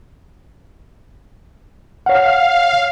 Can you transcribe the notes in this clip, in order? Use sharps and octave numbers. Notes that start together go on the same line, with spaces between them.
C#5 F5 F#5